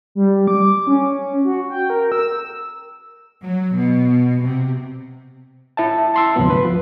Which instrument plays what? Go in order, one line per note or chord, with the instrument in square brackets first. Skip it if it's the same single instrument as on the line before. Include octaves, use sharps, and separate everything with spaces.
[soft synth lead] G3
D6
C#4
F#4
G5
A#4
E6
[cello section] F#3
B2
C3
[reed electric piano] E4 E5 A5
A5 C6 E6
D2 G#2 C3 F3 F#3 B3
B4
F3